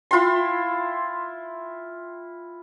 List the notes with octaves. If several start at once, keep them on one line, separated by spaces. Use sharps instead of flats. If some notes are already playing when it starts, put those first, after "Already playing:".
E4 F4 G5 C6